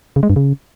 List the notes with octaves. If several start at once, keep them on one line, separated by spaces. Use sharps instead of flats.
C#3
G#3
G2
C#3